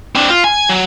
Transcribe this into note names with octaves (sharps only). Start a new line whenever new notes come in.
C4 D4
F4
G#5
F#3